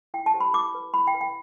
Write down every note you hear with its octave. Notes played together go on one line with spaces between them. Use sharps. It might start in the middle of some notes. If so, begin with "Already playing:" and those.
E4 G5
A5
G4 C5
B5
E4 D6
B4
E4 B5
G5
B4
G5